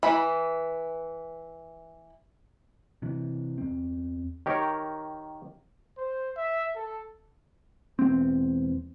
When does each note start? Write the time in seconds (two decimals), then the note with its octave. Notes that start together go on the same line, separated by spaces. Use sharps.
0.03 E3 B5
3.02 C3 E3
3.58 E2 C4
4.46 D#3 G4 A#4 C#5
5.98 C5
6.37 E5
6.76 A4
7.99 E1 E2 C4